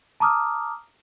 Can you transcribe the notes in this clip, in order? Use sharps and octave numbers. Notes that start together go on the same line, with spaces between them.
A5 A#5 D6 D#6 F6